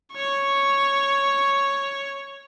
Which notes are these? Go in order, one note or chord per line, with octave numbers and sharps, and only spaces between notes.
C#5 C#6